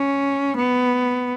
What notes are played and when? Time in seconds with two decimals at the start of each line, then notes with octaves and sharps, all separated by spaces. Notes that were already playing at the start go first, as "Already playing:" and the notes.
Already playing: C#4
0.57 B3